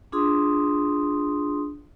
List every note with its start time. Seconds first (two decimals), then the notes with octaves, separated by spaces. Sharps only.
0.12 D4 F4 G#4 C6 D#6